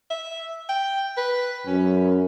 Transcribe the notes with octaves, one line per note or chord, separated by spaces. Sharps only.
E5
G5
B4
F#2 C#4